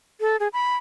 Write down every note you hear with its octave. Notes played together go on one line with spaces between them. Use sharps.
A4
G#4
B5